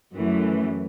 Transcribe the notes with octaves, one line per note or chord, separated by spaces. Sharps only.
F#2 E3 A3